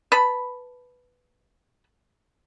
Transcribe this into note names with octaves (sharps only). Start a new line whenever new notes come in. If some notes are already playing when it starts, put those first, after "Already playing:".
B4 A5 B5